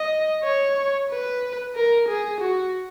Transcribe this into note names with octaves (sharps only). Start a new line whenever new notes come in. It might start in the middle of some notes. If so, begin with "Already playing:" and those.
Already playing: D#5
C#5
B4
A#4
G#4
F#4